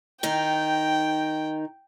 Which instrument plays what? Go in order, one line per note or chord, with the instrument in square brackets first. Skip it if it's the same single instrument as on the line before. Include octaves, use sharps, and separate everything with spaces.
[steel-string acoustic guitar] D#3 D#4 [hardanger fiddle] G5